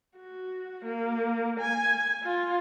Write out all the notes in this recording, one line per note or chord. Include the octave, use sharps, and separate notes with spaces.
F#4
A#3
G#5
F4